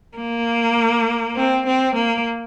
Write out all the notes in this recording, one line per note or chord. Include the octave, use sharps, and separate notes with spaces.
A#3
C4
C4
A#3